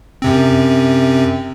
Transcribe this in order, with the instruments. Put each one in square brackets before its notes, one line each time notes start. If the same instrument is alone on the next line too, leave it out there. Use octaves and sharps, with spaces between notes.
[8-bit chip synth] F#2 C3 C4